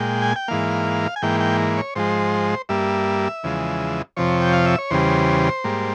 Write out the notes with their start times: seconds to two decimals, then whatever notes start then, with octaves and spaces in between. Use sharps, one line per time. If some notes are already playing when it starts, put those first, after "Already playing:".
Already playing: A#2 G#3 G5
0.22 G#5
0.36 G5
0.48 G#2 E3 A#3 F5
1.16 G#5
1.22 G#2 E3 A#3 G5
1.40 G5
1.77 C#5
1.96 G#2 F3 G#3 C5
2.69 G2 G3 A#3 E5
3.43 E2 C#3 F3 G#3
4.17 F2 C3 F3 C#5
4.41 G5
4.53 F5
4.66 E5
4.78 C#5
4.91 E2 C#3 G3 C5
5.64 G#2 G3 A#3